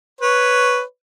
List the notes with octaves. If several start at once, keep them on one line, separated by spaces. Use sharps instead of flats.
B4 C#5